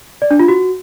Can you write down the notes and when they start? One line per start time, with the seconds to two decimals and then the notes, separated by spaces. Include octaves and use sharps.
0.22 D5
0.31 D4
0.39 F4
0.48 F#4